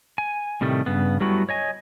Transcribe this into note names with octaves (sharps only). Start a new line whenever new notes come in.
G#5
A2 C3 D#3 G3 A3
G2 C#3 B3
F#3 G3 A3 B3 E4 F#4
C#5 D#5 G#5